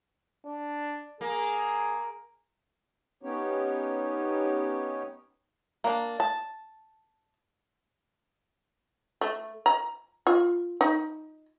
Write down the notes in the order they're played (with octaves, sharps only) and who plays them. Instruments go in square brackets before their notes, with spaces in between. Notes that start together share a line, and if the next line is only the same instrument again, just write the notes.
[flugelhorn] D4
[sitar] A#3 [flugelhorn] G#4
[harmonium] B3 C#4 D#4 G4 C#5
[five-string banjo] A#3 D4
A5
[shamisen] A3
A#5
F4
D#4